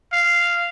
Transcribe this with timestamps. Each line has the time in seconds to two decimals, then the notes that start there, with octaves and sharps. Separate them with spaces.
0.13 F5